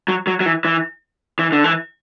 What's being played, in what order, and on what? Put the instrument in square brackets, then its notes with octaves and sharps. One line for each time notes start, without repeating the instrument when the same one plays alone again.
[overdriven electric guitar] F#3
F#3
F#3
E3
E3
E3
D3
E3